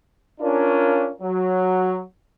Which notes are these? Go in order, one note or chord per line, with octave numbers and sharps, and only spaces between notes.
C#4 D4 F4 A#4
F#3